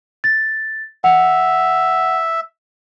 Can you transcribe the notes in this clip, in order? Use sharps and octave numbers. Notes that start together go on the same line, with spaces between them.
A6
E5 F#5